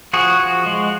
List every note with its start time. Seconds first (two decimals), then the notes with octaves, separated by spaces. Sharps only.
0.13 F3 F#4 G#4
0.40 F3
0.66 G#3